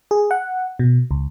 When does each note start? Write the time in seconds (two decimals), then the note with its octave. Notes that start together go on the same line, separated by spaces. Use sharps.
0.11 G#4
0.31 F#5
0.79 B2
1.11 C#2